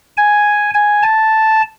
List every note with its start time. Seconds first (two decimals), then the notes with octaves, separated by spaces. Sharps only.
0.17 G#5
0.74 G#5
1.03 A5